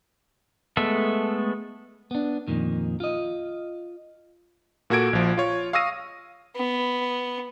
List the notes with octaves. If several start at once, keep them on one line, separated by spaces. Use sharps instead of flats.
G#3 A3 B3 A4 E5
B3 D4
F2 A#2 D#3
F4 D#5
A#2 A#3 F#4 A4 G#6 D7
A#1 F3
F4 C#5
F5 C#6 D#6 E6 A#6 D#7
B3